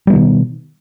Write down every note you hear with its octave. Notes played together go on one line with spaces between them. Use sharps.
B2 D#3 G3 B3